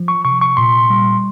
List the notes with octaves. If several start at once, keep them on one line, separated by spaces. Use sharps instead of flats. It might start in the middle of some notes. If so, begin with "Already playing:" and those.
Already playing: F3
C#6
C3 C#6
C#6
A#2 C6
G3